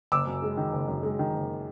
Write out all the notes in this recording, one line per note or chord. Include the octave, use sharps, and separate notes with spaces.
F#1 D6 E6
F#2
G#3
D#3
F#1
F#2
G#3
D#3
F#1